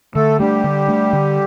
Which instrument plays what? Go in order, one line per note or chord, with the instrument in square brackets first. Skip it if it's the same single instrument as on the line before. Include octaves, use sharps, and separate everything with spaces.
[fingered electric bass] D3 [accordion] A3 A4
[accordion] G3 G4 [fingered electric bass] A3 D4
[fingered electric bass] D3
A3 D4
D3